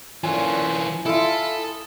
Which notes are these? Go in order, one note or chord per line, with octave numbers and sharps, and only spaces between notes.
A#2 D3 E3 C#4 F4 G#5
E4 F4 A4 D#6